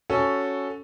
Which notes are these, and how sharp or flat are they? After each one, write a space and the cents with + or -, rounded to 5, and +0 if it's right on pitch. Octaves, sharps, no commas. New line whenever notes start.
C#4 +5 F#4 +0 A4 +0